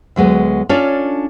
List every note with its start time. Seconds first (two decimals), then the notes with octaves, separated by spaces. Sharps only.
0.16 D2 F#3 G#3 B3
0.69 C#4 D4 F4 A4 C#5 D5